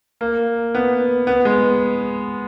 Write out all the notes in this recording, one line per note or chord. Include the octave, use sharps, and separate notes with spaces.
A#3
B3
B3
G#3